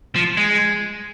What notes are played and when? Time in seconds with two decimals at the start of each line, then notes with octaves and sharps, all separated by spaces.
0.16 F3
0.37 G#3